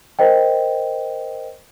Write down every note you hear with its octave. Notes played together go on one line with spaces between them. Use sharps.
A#4 C5 D#5 G5